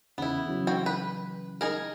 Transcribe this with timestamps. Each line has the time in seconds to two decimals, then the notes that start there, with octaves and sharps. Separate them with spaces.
0.18 E2 C#3 B3 E4
0.47 C#3 E3 F#3
0.67 C4 F#4 G5
0.86 B4
1.61 D#4 G#4 A#4